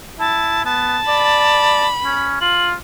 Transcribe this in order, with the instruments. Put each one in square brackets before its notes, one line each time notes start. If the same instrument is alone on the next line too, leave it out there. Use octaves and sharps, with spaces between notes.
[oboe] E4 [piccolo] A5
[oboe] B3 [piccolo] A5
[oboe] D5 [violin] B5
[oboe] C#4
[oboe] F4 [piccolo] F#7